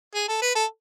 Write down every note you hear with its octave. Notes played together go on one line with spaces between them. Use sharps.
G#4
A4
B4
A4